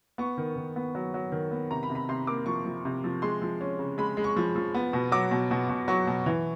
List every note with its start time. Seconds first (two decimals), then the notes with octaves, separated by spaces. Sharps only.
0.18 B3 C#6
0.37 D#3
0.56 D#3
0.76 B3
0.95 F#3
1.14 F#3
1.32 D#3
1.51 B3
1.71 C3 A#5
1.83 B5
1.89 C3
1.95 B5
2.09 C3 C6
2.27 A#3 D6
2.46 F3 C#6
2.66 F3
2.85 C3
3.04 F3
3.22 G#3 C6
3.42 F3
3.61 C#4
3.79 C#3
3.98 G#3 B5
4.17 G#3
4.24 C#6
4.36 F3
4.56 F3
4.74 B3
4.93 B2
5.12 F#3 D6
5.31 B2
5.51 B2
5.69 B2
5.88 F#3 C#6
6.07 B2
6.26 E3